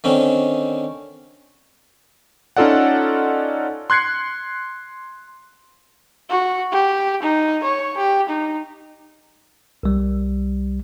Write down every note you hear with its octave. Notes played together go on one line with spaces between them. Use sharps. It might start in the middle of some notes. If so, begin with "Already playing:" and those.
D3 D#3 C4 C#4
C#4 D#4 F4 A4 D5 F#5
C6 F#6 G#6 C7 C#7
F#4
G4
D#4
C#5
G4
D#4
C2 G3